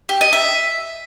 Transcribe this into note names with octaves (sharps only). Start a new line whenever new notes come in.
G4
D#5
E5